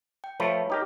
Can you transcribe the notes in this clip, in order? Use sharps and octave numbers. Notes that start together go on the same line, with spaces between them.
G5
F3 A3 B4 C#5 B5
D#4 G4 A#4